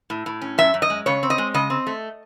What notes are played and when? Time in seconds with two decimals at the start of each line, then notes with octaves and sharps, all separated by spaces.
0.10 A2
0.26 A2
0.41 C#4
0.58 F#2 E5
0.74 F#2
0.82 D#5
0.90 G#3
1.06 C#3 C#5
1.23 C4
1.30 D#5
1.38 G#3
1.54 C#3 D#5
1.70 C4
1.87 A3